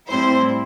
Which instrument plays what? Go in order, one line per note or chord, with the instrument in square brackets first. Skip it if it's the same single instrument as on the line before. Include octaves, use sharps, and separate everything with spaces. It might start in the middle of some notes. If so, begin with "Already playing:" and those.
[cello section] A2 G3 C4 E4 [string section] C5